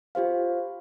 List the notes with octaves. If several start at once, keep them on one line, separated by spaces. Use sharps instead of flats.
F4 G4 C5 F5